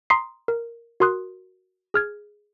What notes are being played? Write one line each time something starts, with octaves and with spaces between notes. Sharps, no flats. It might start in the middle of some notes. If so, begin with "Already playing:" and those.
A#5 C6 D#6 B6 C7
A#4
F#4 A#4 C6 D#6 F#6
G#4 F6 G#6